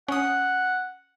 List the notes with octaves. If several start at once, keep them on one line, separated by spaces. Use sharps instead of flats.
C#4 F#5 D#6